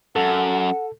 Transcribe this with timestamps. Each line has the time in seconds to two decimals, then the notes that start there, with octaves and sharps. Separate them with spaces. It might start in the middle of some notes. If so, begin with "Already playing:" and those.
0.16 F#2 A4 F#5